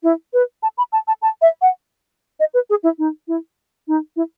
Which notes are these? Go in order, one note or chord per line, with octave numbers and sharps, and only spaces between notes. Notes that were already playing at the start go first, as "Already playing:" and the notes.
E4
B4
A5
B5
A5
A5
A5
E5
F#5
D#5
B4
G#4
E4
D#4
E4
D#4
E4